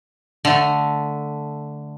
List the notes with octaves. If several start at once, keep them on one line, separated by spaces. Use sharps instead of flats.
D3 A3